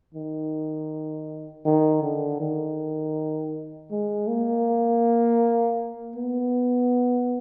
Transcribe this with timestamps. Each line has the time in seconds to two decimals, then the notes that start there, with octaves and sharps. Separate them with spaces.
0.14 D#3
1.65 D#3
2.03 D3
2.40 D#3
3.91 G#3
4.28 A#3
6.16 B3